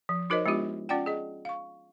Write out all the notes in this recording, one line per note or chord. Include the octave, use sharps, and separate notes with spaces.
F3
D#4 F#4 A#4 C5 C#5 D#5
G#3 B3 D4 F4 G4
C#4 F4 D5 F#5 G5
G#4 D#5
F5 C#6